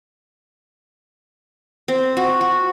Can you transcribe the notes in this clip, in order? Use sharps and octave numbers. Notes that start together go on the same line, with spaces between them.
C4
F#4
F#4